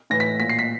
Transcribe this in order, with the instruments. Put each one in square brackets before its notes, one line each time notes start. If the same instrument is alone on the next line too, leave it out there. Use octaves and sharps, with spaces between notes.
[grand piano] A2 E3 A#6
B6
A#2 B6
C7
B6